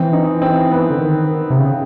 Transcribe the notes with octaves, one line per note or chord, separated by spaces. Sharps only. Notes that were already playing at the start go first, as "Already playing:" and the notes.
Already playing: E3 C4
D#4
C4
B3
D3
D#3
C3
C#3